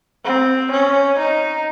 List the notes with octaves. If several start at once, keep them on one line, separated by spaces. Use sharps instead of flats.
C4
C#4
D#4